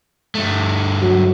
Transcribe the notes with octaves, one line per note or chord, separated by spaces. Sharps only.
G2 A3
F#3